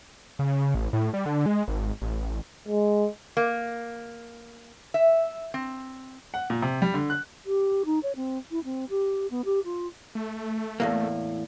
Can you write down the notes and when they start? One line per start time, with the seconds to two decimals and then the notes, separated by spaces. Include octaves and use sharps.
0.39 C#3
0.75 A1
0.93 A2
1.14 G3
1.26 D3
1.46 G#3
1.68 G#1
2.02 A1
2.68 G#3
3.37 A#3
4.94 E5
5.54 C4
6.34 F#5
6.50 A#2
6.62 C3
6.82 G3
6.94 D3
7.10 F#6
7.46 G4
7.85 D#4
8.03 C#5
8.16 C4
8.51 E4
8.64 C4
8.90 G4
9.30 B3
9.45 G4
9.65 F4
10.15 A3
10.80 E2 A2 A#3